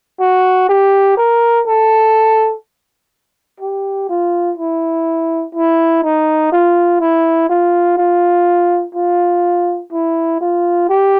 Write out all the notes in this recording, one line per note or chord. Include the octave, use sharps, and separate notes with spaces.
F#4
G4
A#4
A4
G4
F4
E4
E4
D#4
F4
E4
F4
F4
F4
E4
F4
G4